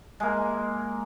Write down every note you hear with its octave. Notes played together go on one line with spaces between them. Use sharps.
G#3 A#3